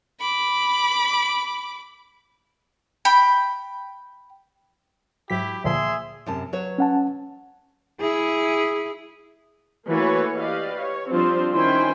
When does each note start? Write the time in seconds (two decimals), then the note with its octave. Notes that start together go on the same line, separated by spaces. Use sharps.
0.20 B5 D6
3.05 G5 B5
5.30 G#2 F#3 E4 G4 B6
5.64 D2 A#2 F3 G#4 E5 C6
6.26 F#2 C3 A5
6.53 F#3 B4 C#5
6.78 C#4 F#5 A5
8.00 E4 G#4
9.87 E3 A3 A#3 F#4 B4 C#5
10.37 G4 B4 D5 D#5 F5
10.80 C#5
11.10 F3 G3 C4 D4 F4 C5
11.51 D#3 C#4 E4 C5 G5 G#5